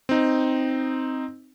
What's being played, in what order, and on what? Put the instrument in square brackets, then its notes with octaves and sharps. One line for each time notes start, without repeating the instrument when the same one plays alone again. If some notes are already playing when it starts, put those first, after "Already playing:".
[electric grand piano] C4 D#4